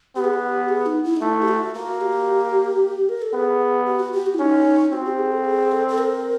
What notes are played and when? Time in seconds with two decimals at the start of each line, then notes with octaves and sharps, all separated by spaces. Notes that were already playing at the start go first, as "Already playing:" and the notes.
0.16 B3 G4
0.24 G#4
0.34 G4
0.69 G#4
0.86 D#4
1.04 E4
1.16 D#4
1.21 A3 E4
1.42 G4
1.48 F#4
1.74 A#3 F#4
2.01 G4
3.09 A#4
3.22 A4
3.33 B3 G#4
3.86 G4
4.00 F#4
4.13 G4
4.26 F#4
4.34 E4
4.39 C#4 D#4
4.92 C4 F#4
5.05 G4
5.19 G#4
5.32 A4
5.45 G#4
5.72 A4
5.89 A4
5.98 A#4